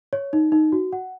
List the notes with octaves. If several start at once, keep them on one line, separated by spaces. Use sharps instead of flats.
C#5
D#4
D#4
F#4
F#5